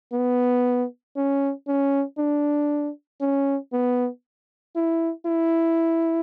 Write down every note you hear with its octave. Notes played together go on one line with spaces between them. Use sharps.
B3
C#4
C#4
D4
C#4
B3
E4
E4